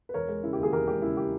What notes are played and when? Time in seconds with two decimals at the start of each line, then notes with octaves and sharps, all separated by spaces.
0.09 B4
0.14 E1 A#4 C#5
0.29 G#3
0.43 C#3 E4
0.53 G4
0.58 D#2 G#4
0.73 E1 G4 A#4
0.88 G#3 G4
1.02 C#3 E4
1.17 G4